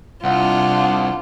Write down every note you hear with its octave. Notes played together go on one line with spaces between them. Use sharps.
C2 D4 F4 F#5